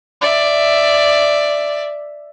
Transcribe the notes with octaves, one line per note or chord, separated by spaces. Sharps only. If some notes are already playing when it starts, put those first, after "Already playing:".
D5 E5